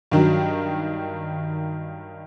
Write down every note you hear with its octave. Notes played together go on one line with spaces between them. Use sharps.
G2 D#3 F#3